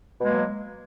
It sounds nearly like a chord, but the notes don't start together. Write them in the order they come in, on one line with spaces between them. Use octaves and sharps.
B2 G#3 A#3 F#3